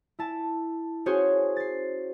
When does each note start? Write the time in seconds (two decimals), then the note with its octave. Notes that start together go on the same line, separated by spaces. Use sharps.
0.19 E4 A5
1.06 C#4 F#4 G#4 C5 C#5
1.56 A6 C7